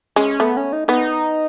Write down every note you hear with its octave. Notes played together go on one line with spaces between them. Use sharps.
G#3 C#4
A3 B3
C#4
D#4
B3 D#4